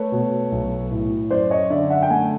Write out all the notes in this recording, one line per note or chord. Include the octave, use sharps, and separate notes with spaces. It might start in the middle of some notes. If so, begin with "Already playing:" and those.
Already playing: A3 B4 C#5
B2
B1
A2
F#2 C5 D5
C#5 D#5
D3 D5 E5
E5 F#5
G5
A3 F#5 G#5